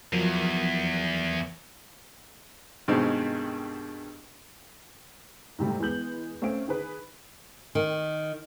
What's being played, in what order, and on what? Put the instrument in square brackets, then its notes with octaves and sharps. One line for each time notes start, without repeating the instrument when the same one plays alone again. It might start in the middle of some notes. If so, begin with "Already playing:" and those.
[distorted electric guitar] E2 [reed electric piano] F3 F#3 A#4
[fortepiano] G2 B2 D#3 G#3 C4 D#4
[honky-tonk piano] G#2 C3 G3 A3
E3 G#3 B3 G6 F#7
A3 C4 C#4 F5 D7
D#3 G#4 B4
[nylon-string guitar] D#3